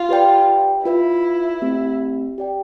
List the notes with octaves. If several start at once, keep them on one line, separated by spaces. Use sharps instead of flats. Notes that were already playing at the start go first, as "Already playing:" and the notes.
Already playing: F4
G4 B4 D5 G5
E4 F4 B4 E5
A3 C4 G4
G4 D5 G5